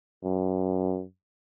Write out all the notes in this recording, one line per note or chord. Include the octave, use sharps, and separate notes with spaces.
F#2